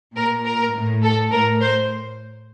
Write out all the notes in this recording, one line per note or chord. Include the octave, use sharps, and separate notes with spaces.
A#2 A#4
A#4
A2
A4
A2 A#4
C5